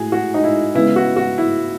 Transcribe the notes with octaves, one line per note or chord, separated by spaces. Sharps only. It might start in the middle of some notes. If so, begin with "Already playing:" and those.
Already playing: A2 A3 F#4 G#4
F#4
D#4
E4
C#3 G#3 B3 E4
F#4
F#4
E4